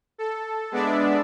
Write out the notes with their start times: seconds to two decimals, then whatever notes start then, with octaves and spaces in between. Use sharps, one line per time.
0.18 A4
0.71 G#3 B3 D4 D5 E5